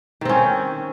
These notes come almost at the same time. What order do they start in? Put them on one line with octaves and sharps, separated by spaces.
D#3 C4 C#4